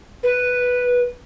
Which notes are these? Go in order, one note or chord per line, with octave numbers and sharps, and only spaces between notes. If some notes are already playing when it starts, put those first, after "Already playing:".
B4